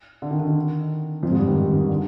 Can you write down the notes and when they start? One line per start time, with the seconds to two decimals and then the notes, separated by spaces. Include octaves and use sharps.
0.22 D3
0.31 D#3
0.40 D3
0.47 D#3
1.23 F2 F3
1.30 G#2 G#3
1.39 G2 G3
1.47 D#3
1.73 D#3
1.89 D3